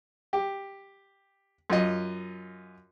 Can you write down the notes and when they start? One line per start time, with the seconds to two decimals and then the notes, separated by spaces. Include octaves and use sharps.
0.33 G4
1.70 F#2 F4 D#5